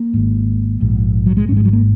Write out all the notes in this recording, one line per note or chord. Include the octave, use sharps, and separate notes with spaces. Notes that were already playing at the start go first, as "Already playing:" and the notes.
Already playing: A#3
G#1 G#2
A#1 G#2
F#3
G#3
G#1 G#2 C#4
G#3
F#3
A#3